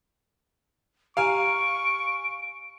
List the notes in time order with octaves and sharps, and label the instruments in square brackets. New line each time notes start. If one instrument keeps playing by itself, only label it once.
[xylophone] G4 A#5 F6 [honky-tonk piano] F5 G#5 [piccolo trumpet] C#6 [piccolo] D7